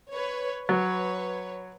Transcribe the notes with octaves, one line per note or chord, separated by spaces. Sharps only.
B4 C#5
F#3 B4 C#5